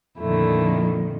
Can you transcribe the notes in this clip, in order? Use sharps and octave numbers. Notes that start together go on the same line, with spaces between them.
F2 A#2 D3 D#3 A3 E4